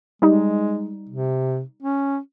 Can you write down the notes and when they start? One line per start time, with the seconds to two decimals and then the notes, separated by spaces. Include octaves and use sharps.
0.22 G3 G#3 D#4
1.09 C3
1.82 C#4